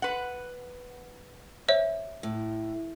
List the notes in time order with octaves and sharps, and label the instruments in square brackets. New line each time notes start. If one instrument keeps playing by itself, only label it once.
[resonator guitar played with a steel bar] B4 F#5
[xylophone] C5 C#5 E5
[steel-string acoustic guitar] A2